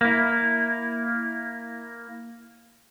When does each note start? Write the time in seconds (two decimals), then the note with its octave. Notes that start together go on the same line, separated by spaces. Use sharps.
0.01 A#3 E4